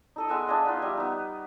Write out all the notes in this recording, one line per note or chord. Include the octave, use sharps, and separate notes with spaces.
D#4 A4 D#5
G#3 B3 G#5 E6
D4 G#4 D#5 F5
B3 D#4 F4
G3 E5
B3 D#4